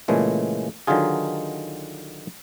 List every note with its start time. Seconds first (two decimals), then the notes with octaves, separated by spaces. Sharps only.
0.08 A#2 C#3 E3 G#3 A3
0.87 D3 D#3 F#3 D#4 F4 G#4